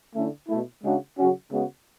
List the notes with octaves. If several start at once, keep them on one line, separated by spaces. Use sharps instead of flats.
D3 A3 C#4 E4
B2 A3 E4
C#3 G#3 D4 F#4
C#3 F#3 C#4 F#4
C#3 G#3 B3 F#4